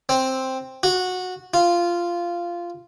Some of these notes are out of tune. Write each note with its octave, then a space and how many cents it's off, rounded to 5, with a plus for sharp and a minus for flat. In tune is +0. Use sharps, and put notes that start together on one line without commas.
C4 +5
F#4 -15
F4 -10